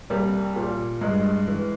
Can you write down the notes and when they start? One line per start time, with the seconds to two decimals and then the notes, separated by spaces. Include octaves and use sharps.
0.10 C2 G3 A#3
0.56 A#2
1.01 G2 G#3
1.48 E3